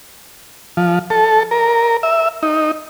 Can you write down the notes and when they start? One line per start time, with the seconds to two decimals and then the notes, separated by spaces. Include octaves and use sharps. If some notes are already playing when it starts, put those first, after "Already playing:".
0.77 F3
1.10 A4
1.51 A#4
2.03 E5
2.43 D#4